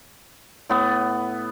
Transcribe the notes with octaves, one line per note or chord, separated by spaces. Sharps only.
A2 B3